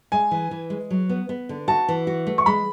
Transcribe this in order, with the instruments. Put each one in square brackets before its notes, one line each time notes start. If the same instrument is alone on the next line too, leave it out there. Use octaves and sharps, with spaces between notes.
[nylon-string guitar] G#3 [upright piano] G#5
[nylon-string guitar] E3
E3
G#3
F#3
B3
B3
D3
[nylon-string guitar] F#4 [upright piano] A5
[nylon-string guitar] E3
F#4
A3
[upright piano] C#6
[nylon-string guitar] G#3 [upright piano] B5